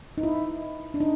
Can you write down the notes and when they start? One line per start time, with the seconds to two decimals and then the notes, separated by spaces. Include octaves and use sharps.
0.18 D#4
0.23 E4
0.94 D4
1.00 D#4